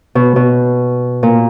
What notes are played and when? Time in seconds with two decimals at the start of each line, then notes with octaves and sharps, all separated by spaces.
0.15 B2
0.36 B2
1.23 A#2